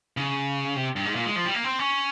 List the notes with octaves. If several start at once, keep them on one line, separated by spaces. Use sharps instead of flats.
C#3
C3
G2
G#2
A#2
G#3
F3
G3
A#3
C4
C#4